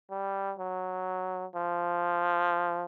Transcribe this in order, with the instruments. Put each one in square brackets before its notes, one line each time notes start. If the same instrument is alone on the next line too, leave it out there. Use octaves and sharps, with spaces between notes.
[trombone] G3
F#3
F3